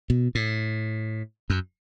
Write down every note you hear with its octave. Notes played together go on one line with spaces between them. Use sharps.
B2
A2
F#2